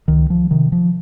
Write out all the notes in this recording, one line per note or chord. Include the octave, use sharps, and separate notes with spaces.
C#2 D#3
F3
C3 D#3
F3